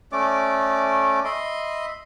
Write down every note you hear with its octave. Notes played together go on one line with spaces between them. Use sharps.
A3 C#4 D5 D6
D#5 E5 B5 C6